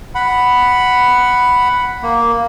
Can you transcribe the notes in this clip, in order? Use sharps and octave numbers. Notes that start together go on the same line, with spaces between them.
F#5 B5
A#3